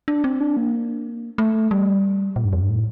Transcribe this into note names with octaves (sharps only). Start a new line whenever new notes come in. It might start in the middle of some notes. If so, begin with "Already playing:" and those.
D4
C4
D4
A#3
A3
G3
A#2
G2
F2
G2
A2